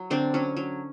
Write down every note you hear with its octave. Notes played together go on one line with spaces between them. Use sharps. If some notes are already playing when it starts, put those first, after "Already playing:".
Already playing: F#3
D3 C4 D4
F#3 C#4
F#3